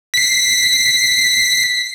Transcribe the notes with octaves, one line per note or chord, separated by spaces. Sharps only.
B6 C7